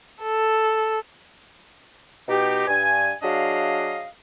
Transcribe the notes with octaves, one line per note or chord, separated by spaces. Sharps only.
A4
B2 D#4 G4
G2 G#5
F#3 D4 G#4 D#5 F5